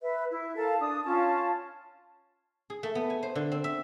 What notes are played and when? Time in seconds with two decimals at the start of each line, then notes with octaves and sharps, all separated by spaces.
0.01 B4 E5
0.31 E4
0.57 A4 A#4 F5 A5
0.80 D4 D#6
1.05 C#4 F4 A5
2.70 G#4
2.83 A3
2.95 B3
3.10 G#5
3.23 C5
3.35 D3
3.52 C4
3.64 E5